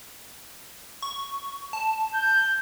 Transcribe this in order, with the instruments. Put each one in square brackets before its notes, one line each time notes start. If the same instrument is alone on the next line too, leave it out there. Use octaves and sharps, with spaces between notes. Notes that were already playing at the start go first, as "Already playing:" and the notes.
[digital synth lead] C#6
A5
[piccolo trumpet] G6